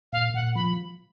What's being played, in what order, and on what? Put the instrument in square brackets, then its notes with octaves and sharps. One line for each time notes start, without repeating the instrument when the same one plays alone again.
[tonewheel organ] A#2 [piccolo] F5
[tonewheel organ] A#2 [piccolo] F#5
[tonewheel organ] F3 [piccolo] B5